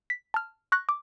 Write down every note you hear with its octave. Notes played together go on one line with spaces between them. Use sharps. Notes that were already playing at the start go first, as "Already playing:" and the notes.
B6
A5 F6
C#6 F#6 A#6
D6